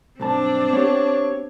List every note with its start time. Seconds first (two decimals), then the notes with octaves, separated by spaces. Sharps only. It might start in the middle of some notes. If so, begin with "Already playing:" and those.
0.20 B1 G2 C4 D4 A5
0.73 B3 G4 C#5